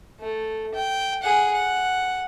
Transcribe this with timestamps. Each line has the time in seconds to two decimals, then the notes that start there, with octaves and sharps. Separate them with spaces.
0.20 A3
0.75 G5
1.23 G#4 F#5
1.53 F#5